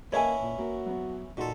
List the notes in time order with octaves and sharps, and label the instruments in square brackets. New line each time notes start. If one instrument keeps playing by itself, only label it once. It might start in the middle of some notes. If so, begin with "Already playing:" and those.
[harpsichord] E3 C#4 E4 [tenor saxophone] A#3 [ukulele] C#5 G#5 [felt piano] D#5 A5
[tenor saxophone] A#2
[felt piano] A#3 [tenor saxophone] F#4
[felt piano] F#3 B3
[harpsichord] A#2 A4 [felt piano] D#4 F#4 C6